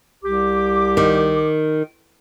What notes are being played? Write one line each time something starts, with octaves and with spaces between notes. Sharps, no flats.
C2 G4 D6
D#3